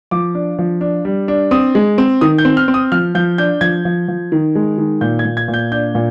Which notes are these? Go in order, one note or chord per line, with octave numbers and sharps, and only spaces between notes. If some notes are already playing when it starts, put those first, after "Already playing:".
F3 D6
D4
F3
D4
G3
D4
C4 D#6
G#3
C4
D#3 D#6
G6
C4
F6
C4
D#6
F3 F6
F3 G6
D4 G6
F3 G#6
F3
F3
D#3
G#3
D#3
A#2 G6
G#6
A#2
G#6
A#2
G6
D4 G6
A#2